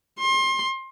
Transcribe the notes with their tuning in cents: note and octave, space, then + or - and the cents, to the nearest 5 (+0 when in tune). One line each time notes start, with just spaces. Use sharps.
C6 +30